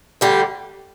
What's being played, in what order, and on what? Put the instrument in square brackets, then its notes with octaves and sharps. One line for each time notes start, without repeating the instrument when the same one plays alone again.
[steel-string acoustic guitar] D2 D3 G3 G4